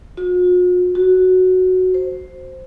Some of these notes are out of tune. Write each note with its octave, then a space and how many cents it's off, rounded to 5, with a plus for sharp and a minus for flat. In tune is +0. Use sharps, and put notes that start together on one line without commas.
F#4 -45
F#4 +0
C5 +5